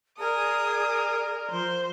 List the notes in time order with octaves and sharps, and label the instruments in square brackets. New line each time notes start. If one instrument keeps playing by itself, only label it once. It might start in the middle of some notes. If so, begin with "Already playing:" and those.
[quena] G#4 [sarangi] A#4 [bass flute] D5 [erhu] D#6
[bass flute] F3 [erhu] C5